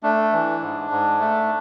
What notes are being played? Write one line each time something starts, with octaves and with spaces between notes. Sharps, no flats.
A3 D4
E3
G#2
G#2
A3